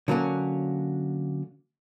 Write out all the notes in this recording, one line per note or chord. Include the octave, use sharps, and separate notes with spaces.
D3 F#3 A#3 C#4